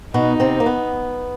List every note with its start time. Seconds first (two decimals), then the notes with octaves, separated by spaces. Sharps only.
0.14 B2 B3 D#4
0.40 C3 C4
0.60 A#3
0.66 B3